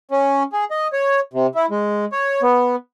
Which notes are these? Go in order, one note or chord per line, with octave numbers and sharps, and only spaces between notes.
C#4
G#4
D#5
C#5
C3
E4
G#3
C#5
B3